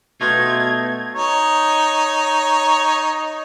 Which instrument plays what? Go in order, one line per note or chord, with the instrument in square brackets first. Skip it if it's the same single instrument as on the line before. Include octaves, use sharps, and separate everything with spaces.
[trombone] B2 [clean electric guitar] A3 D#4 F4 [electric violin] G#6
[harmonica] D#4 C#5